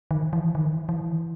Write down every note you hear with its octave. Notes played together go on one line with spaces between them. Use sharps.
D#3
E3
D#3
E3